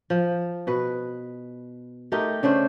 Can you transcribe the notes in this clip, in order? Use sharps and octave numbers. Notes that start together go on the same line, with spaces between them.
F3
B2 B4
A3 D#4 G4 A#4
C#3 A3 D4 C5